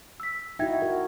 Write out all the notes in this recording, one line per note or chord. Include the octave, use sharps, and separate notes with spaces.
E6 B6
D#4 E4 F#4 E5 G5 G#6
F#4 A#4